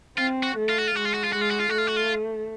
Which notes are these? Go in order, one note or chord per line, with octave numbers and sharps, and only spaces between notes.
C4 F4
F#4
A3
F4
F#4
F4
G#3 F#4
F4
F#4
F4
G#3 F#4
F4
F#4
F4
A3 F#4
F4
F#4
F4